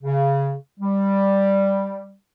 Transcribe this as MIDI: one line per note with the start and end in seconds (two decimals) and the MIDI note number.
0.04 0.54 49
0.80 2.11 55